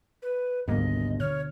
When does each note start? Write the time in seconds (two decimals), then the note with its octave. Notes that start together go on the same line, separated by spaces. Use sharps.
0.22 B4
0.68 G#1 D2 G#2 B2 D3 G3 A#3 D#5
1.20 B2 D3 C#5 F6